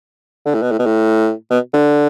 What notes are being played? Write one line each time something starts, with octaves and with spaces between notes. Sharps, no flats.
D3
A2
B2
A2
B2
A2
B2
D3